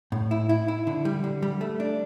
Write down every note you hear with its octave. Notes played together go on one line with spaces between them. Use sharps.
A2
E4
E4
E4
D3
G3
D3
G3
A3
D4